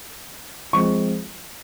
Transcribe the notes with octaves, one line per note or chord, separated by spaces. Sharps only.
F3 G#3 C4 C#6